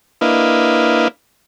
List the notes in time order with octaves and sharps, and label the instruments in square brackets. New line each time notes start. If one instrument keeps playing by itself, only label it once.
[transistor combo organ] A#3 D4 E4 B4 D#5 F5